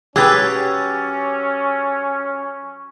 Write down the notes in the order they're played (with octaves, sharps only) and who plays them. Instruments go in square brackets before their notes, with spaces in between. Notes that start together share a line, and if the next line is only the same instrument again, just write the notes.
[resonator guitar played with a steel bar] F#3 G4 [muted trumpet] C#4 [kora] G#4 B4 [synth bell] D6 E6 A6